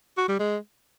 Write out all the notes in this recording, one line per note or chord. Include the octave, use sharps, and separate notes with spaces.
F#4
G3
G#3